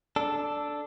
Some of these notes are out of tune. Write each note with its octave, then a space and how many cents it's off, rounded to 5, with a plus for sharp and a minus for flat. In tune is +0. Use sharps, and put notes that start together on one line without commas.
D4 +0 A4 +0